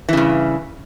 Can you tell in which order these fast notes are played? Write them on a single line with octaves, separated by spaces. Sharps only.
E3 C#3 G2